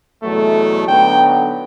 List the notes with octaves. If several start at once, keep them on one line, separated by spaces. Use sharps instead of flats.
E2 B2 F#3 A3
D3 F#3 B3 D#4 G5